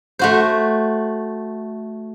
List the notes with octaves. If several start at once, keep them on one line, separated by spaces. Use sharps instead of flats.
A3 F#4 C5